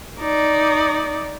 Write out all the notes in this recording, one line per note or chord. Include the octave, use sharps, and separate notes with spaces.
D#4 D5